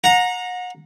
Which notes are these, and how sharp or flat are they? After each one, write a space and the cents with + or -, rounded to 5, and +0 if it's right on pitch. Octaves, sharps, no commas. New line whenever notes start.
F#5 -35 A#5 +0